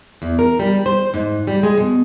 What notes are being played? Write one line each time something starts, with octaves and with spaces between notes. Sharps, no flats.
E2
A#4
G3
C5
G#2
G3
G#3
B2